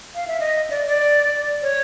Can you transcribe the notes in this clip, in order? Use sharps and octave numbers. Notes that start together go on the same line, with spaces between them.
F5
E5
D#5
D5
D5
C#5